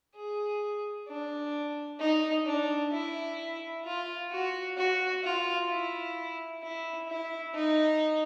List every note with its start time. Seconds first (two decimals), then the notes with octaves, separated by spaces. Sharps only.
0.15 G#4
1.08 D4
2.00 D#4
2.46 D4
2.93 E4
3.85 F4
4.31 F#4
4.77 F#4
5.24 F4
5.70 E4
6.63 E4
7.09 E4
7.54 D#4